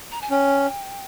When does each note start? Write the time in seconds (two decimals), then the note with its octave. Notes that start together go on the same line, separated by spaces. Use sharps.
0.11 A#5
0.21 G#5
0.30 C#4 G5